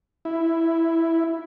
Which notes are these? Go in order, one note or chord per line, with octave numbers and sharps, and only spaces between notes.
E4